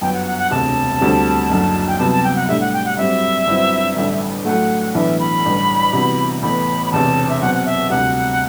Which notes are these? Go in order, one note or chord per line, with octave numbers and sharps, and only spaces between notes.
G1 F#2 F#3 B3 G5
F#5
F#5
F#5
E1 D2 C3 A5
D2 D3 G3 C4
F#1 F#2 D3
G5
C2 C3 F#3 B3 A5
A5
G5
F#5
A2 G3 D4 G4 E5
F#5
G5
F#5
G2 F#3 C4 G4 E5
G1 G2 F#3 C4 E4
A1 G2 D3
A2 F#3 A3 F#5
B1 A2 E3 B3 D4 E5
B5
A1 G2 D3
C3 E3 G3 B3 F#4
A1 A2 E3 B3 B5
B5
E1 E2 C3 A5
E5
B2 F#3 C4 F#5
F#5
E5
D2 C3 G3 F#5